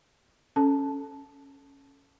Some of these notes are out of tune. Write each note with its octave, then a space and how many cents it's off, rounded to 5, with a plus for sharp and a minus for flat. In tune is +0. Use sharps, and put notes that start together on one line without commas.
C#4 +0 A4 +0 A5 -15